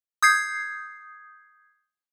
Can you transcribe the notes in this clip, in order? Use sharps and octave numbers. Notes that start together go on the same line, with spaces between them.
D#6 G6 G#6 C7